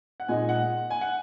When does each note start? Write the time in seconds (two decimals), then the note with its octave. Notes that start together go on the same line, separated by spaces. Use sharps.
0.20 F#5
0.28 A#2 G#3 D#4 G#5
0.49 F#5
0.90 G#5
1.01 F#5